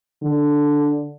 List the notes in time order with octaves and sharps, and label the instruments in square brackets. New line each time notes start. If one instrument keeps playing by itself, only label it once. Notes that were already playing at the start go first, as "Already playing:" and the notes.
[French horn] D3